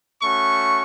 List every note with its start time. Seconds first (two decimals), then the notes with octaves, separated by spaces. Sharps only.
0.22 A3 C#4 F#4 C#6